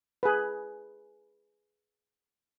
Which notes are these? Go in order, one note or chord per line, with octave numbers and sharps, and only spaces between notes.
G#4 B4